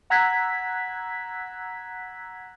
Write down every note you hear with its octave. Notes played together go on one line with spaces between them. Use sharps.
F#5 A#5 E6 F#6 G#6 B6